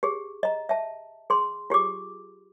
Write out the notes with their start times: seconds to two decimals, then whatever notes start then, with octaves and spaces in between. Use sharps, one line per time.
0.03 G4 G#4
0.43 D#5 A#5
0.69 E5 A5
1.30 G#4 C6
1.70 F4 G4 G#4 D6